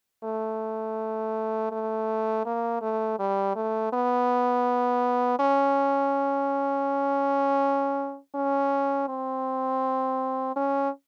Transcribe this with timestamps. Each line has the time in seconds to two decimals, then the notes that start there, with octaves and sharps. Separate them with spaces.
0.24 A3
1.72 A3
2.46 A#3
2.82 A3
3.19 G3
3.56 A3
3.93 B3
5.40 C#4
8.35 C#4
9.08 C4
10.56 C#4